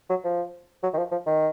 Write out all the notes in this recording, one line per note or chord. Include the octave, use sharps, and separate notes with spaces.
F#3
F3
F#3
D#3
F3
F3
D#3